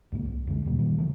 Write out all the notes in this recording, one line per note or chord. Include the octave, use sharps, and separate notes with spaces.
C#2 G#2 A#3
C2
F2 D3 G#3
D#2 B2 G3 A#3
A#2 D#3 G3
C#3 E3 A3